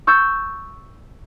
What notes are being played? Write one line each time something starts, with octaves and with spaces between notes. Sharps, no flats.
C#6 E6 G6 A6 C#7